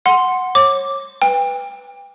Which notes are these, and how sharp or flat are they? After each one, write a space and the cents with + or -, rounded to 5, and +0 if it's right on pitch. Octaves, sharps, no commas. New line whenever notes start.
F#5 +0 C6 +0
C#5 -25 D6 +0
B4 +0 G5 +35